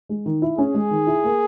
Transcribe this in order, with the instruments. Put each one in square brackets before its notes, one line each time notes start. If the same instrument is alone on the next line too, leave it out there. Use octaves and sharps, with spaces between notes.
[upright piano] G#3
D#3
E4
[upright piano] C#4 [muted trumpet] G#4
[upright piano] G#3
D#3
E4
A#3